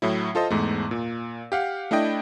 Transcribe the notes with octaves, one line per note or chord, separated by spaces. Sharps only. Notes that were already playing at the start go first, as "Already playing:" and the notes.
A2 F#3 E4
F4 A4 C5 D#5
E2 G#2 A3
A#2
G4 F5 F#5
A3 D4 E4 D#5 G5